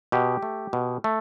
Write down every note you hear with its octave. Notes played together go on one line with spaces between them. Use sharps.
B2 G4
A3
B2
A3